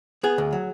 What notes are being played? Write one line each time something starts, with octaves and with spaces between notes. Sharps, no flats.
B3 G#4
D2
F#3